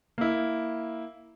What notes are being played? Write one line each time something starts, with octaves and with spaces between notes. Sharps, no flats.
A#3 E4